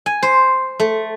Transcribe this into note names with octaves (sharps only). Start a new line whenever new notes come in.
G#5
C5
A3